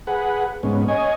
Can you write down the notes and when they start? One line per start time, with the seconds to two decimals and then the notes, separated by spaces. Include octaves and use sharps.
0.07 G#4 B4 F#5
0.63 G#2 B3 C#4
0.88 C#5 D#5 G#5